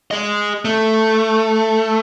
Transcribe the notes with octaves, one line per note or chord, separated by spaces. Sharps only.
G#4 D#5
A3